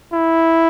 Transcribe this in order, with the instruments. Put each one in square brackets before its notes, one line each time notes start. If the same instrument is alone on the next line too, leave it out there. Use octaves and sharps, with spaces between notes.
[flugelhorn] E4